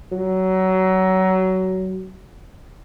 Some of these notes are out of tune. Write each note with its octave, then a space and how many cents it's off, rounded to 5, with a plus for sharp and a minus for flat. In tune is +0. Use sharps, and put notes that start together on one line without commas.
F#3 +20